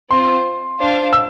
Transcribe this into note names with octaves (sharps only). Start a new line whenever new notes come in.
C4 F4 C5 C6
D4 F4 C5 F5
E6